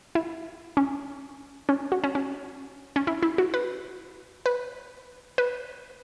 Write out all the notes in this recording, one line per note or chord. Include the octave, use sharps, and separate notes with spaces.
E4
C#4
C#4
F#4
C#4
C#4
C#4
E4
E4
F#4
B4
B4
B4